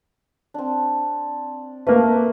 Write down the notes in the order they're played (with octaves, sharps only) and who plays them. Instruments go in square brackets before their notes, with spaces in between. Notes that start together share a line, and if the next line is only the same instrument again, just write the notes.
[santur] C4 D4
[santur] A3 [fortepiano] A#3 B4